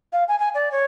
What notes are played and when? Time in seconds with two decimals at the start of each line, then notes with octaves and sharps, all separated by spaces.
0.13 F5
0.28 G#5
0.40 G#5
0.54 D5
0.72 C#5